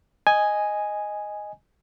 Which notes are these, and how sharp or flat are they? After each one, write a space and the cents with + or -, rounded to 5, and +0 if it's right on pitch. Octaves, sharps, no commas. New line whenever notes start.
D#5 +0 G#5 +0